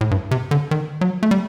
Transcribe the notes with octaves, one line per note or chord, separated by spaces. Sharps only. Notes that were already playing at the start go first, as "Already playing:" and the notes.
A2
G2
C3
D3
D#3
F#3
A3
G3